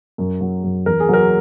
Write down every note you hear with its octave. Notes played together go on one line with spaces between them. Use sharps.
F#2
F#3
F#2
E2 A#4
G#4
F#3 A#4